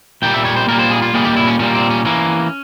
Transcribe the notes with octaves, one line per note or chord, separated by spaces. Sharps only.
A#2 G3 A#3 G5
E5
C#5
C5
A#2 G3 A#3 A#4
C5
G#4
F4
A#2 G3 A#3 G#4
G4
E4
C#4
A#2 G3 A#3 C#4
C4
C#4
E3 A#3 C#4